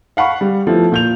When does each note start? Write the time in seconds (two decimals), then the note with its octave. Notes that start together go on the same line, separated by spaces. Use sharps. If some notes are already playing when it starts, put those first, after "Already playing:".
0.17 F5 F#5 B5 C#6
0.41 G3
0.67 F3 A3 B3 E4
0.92 A#2 G6 F7